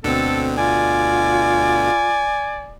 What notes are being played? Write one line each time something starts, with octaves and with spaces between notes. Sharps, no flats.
D2 B2 D3 C4 A4
F4 D5 G#5